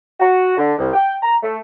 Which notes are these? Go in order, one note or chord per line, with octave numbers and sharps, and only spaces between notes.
F#4
D3
C2
G5
A#5
A3